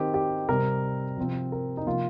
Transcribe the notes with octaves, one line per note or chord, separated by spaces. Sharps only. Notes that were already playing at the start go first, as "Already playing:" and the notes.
Already playing: D#3 C4 G4
G4
C3 G3 C4 A#4
C3 F3 C4
A#4
D#4
C3 F3 A#3 F4